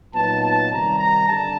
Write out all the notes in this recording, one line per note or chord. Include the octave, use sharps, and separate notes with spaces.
A#2 F#3 B3 D#4 A5
A5
C3 D#3 G3 A#5
A#5
G2 D3 A5